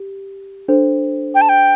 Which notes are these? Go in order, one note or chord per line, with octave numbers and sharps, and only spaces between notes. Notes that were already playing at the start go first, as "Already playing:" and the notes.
Already playing: G4
D4 A4 C5
G5
A5
G5